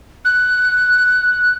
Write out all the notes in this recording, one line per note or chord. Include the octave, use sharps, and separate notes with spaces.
F#6